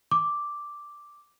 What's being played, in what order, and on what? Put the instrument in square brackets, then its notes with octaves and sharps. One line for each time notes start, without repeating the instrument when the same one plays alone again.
[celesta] D6